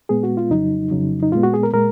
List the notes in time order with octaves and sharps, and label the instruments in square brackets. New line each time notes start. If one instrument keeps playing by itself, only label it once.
[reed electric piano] A#2 G#3 B3 G#4
F#4
F4
F2 C#3 F#3 D#4
F2 C#3 F#3
D#4
A#2 G#3 B3 F4
F#4
G#4
A#4
A#2 G#3 A#4